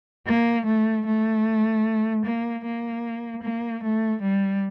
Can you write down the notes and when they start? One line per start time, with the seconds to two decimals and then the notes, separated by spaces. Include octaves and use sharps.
0.26 A#3
0.65 A3
1.06 A3
2.24 A#3
2.63 A#3
3.43 A#3
3.82 A3
4.22 G3